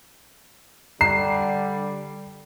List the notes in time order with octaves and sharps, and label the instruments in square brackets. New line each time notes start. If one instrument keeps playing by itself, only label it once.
[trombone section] D3 G3 [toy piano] A#5 [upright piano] C7